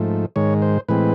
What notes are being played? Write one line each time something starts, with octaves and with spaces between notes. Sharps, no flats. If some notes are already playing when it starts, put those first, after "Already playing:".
Already playing: G#2 F3 A3
G#2 D#3 G#3 C#5
C5
A2 E3 G#3 C4 B4